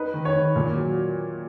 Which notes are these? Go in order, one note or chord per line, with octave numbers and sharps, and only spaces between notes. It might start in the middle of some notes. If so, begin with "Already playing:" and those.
Already playing: D#4 B4
D#3
C#5
D#3
A#2
F#3